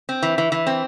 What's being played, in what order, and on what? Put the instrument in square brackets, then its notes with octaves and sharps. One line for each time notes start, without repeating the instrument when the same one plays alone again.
[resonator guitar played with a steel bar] C4
E3
E3
E3
C4